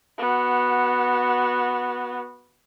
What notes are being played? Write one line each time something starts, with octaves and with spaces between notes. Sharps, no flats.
B3 F#4